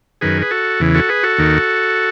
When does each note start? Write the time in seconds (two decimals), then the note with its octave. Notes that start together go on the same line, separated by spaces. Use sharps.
0.21 F#2 D#3 G#4 B4
0.42 B4
0.51 F#4 A4
0.80 E2 C#3 E3
0.94 F#4 A4
1.09 G#4 B4
1.23 F#4 A4
1.38 D#2 D#3